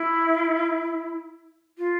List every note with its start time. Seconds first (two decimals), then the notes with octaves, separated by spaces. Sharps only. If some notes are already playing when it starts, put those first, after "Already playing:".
Already playing: E4
1.78 F4